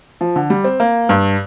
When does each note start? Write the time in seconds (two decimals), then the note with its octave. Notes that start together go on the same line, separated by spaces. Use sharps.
0.21 F3
0.36 D3
0.50 G3
0.64 C4
0.80 A#3
1.09 G2